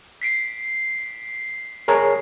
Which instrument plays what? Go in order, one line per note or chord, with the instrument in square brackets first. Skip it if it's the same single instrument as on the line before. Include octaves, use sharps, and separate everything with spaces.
[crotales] B6 C7 D7
[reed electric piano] G#4 A#4 C#5